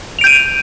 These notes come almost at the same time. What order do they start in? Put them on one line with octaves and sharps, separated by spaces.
F7 D7 G6 D#7